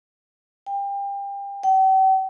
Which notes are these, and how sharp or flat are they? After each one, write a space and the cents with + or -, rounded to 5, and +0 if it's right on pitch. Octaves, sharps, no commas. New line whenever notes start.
G5 +30
G5 -45